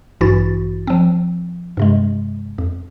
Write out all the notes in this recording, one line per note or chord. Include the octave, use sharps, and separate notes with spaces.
A1 G2 E3 E4 F#4 A6
F3 C4
G2 C3 G#3
F2